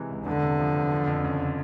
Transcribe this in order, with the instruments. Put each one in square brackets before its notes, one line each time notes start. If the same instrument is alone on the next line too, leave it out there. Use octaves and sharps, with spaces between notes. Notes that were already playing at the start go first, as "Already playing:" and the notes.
Already playing: [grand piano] C3 E3 G#3
C#2
[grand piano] E2 [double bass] D3
[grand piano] C3
F3
E2
F3
F2
C#3